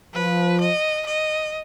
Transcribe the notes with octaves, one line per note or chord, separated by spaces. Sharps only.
F3 B4
D#5
D#5